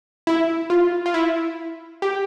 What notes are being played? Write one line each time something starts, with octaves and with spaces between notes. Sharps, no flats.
E4
F4
F4
E4
G4